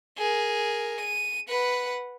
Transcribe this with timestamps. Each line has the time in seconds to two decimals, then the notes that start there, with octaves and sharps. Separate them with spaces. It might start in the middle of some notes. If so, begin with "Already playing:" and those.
0.18 G#4 A#4
1.01 D#7
1.49 B4 F#5